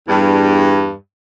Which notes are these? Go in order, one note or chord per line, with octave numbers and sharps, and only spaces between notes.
E2 G2